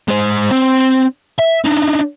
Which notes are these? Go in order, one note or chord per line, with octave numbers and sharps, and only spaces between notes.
G#3 C5
C4
E5
D4 D#4